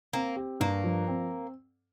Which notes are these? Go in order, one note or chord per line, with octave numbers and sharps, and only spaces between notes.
A#3 C4
G4
G2 A#3
F3
C4